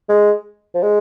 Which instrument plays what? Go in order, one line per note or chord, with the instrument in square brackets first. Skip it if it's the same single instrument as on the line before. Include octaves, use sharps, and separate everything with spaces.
[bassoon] G#3
F3
G#3